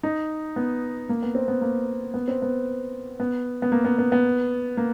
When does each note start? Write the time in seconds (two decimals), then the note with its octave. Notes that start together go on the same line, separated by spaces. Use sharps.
0.03 D#4
0.56 B3
1.09 A#3
1.22 B3
1.35 C4
1.48 B3
1.61 A#3
2.14 B3
2.28 C4
2.42 B3
3.20 B3
3.62 B3
3.72 A#3
3.85 B3
3.99 B3
4.12 B3
4.77 A#3